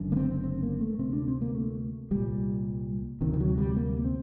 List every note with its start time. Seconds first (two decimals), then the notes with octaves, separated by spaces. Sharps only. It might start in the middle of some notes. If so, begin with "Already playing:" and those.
Already playing: F#1 F#2 D3
0.12 A#3
0.16 C4
0.44 C4
0.63 A#3
0.81 A3
0.99 D2 C3 C4
1.13 D4
1.28 C4
1.42 A#3
1.55 A3
2.11 C2 A#2 G3
3.21 D2 C3 D#3
3.34 D#3
3.40 F#3
3.58 G3
3.76 A#3
4.05 C4